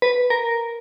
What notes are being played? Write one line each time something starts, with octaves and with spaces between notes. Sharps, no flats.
B4
A#4